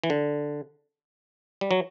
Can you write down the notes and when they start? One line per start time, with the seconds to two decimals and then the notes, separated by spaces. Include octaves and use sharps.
0.04 E3
0.10 D3
1.61 G3
1.71 F#3